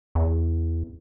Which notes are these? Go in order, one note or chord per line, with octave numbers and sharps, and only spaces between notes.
E2